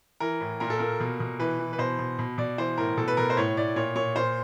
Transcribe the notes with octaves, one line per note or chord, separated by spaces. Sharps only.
E3 A#4
A2
A#2 A#4
A4
A#2 A#4
B2
B2
E3 B4
E3
B4
B2 C5
B2
B2
B2 D5
E3 C5
A2 A#4
B2 A4
B4
B2 A#4
C5
A2 C#5
A2 D5
A#2 C#5
A#2 C#5
A#2 C5